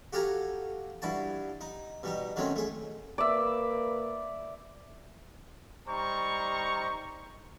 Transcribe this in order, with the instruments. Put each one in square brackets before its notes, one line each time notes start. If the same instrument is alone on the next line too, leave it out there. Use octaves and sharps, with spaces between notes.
[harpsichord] F#4 G4 A4 F5 G#5 A#5
G2 E4 F#4 A5
D#4
B2 G3 D#4
D#3 F#3 A3 C4 C#4
A3 G#4
[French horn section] A#3 B4 [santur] D5 E5
[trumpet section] G3 D#4 C5 A#5 C#6